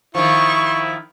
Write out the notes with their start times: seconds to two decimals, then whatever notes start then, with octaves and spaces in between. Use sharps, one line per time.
0.15 D#3 F3 E4 C#6